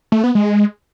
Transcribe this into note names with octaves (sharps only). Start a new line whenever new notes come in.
A3
B3
G#3